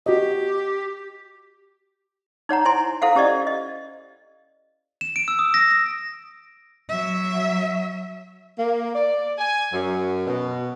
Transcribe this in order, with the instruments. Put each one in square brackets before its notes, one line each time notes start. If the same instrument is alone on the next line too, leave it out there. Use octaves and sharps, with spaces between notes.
[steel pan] F#4 D#5 [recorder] G4
[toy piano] D#4 C#5 F#5 A#5
E4 C5 G#5 C6
E4 A4 C5 F5 F#5
C#4 G4 C5 D5 D#5
D#5
[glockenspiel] E7
D7
E6
D#6
A#6
A#6
[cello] F#3 E5
[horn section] A#3
D5
G#5
F#2
B2